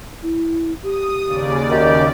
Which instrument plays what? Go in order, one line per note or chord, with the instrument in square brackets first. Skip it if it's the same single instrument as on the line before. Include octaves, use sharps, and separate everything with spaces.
[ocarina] E4
[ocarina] G4 [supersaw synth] D#6
[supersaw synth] D#2 C#3 D5
[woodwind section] F#2 D#3 G4 [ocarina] D#5